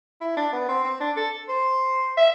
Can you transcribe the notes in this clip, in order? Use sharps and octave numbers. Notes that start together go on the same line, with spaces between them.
E4
D4
B3
C4
C4
D4
A4
C5
E5